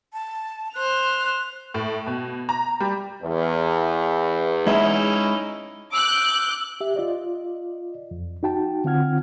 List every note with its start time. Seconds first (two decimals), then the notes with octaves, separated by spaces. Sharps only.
0.13 A5
0.74 C5 F#6 F7
1.74 A2
2.07 B2
2.49 A#5
2.80 G3
3.22 E2
4.67 G#3 C#4 D#4 E4 E5
5.93 D6 E6 F#6 G6
6.81 G4 E5
6.96 F4 D5 D#5
8.11 F2
8.43 D#4 F#4 G5 A5
8.84 D3 C4 F4 F#5 F6 G#6